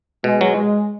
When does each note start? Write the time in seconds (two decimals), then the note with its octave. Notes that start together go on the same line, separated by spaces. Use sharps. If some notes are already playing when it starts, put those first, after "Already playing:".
0.24 B2 G#3
0.41 F#3